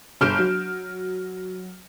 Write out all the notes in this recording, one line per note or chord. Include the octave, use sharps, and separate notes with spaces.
G1 F6 G6 D7 E7
F#3